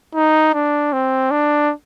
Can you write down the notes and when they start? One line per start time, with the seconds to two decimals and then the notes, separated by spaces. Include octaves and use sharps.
0.15 D#4
0.54 D4
0.93 C4
1.31 D4